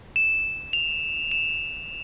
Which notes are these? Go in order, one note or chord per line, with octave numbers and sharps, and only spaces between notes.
E7
F7
E7